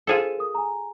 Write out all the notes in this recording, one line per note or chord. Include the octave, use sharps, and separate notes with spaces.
D4 F4 G#4 A4 C5 E7
A#4 D#6
G#5 A#5